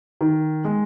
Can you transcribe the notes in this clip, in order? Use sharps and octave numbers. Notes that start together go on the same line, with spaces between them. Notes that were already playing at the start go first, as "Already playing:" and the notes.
D#3
G#3